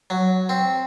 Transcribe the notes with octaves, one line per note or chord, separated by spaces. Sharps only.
F#3
C4